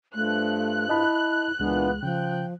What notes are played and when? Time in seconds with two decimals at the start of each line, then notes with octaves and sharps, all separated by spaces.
0.15 G2 F3 A3 F#6
0.89 E4 D#5 A5 B5
1.60 C#2 A#2 E3 G#3 B3 D4
2.03 C#3 F3 G5